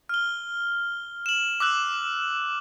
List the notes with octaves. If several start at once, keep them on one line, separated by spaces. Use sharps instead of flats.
F6 G7
E7 F#7
D6 E6 F#6 F#7